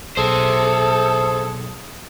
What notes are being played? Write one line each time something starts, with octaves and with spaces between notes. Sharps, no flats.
B1 G#4 A4 C5 E5